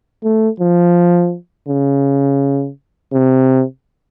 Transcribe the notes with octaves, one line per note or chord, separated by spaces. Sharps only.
A3
F3
C#3
C3